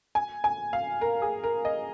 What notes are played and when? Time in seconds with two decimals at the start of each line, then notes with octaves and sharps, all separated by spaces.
0.15 G#5
0.44 G#5
0.73 F5
1.01 A#4
1.22 G#4
1.44 A#4
1.65 D#5